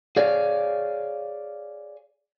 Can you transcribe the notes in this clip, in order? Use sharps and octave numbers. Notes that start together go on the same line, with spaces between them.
G#4 C#5 D5 F5